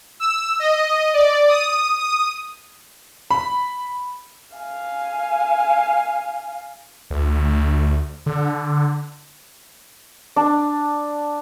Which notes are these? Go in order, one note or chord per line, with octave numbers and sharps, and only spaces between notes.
E6
D#5
D5
D#6
D#6
B5
F5 G#5
D2
D3
D4